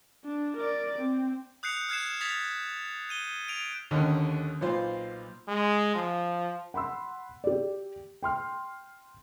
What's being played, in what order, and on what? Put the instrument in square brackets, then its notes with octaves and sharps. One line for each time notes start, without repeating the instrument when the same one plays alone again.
[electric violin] D4
A#4 D5
C4
[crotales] D#6 F#6 G6 C7 C#7 F7
F6 F#6 G#6 C7 E7
D#6 G#6 A6 B6 F7
G6 D#7 G7
D7 F7
[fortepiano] D#2 D3 D#3 C#4
B1 A#2 F4 C5
[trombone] G#3
F3
[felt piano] F#5 B5 C6 E6
G4 D5
G5 C6 F6